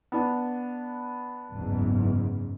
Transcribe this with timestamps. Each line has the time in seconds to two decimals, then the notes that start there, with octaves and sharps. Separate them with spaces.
0.12 B3 D4
1.52 F#1 E2 G#2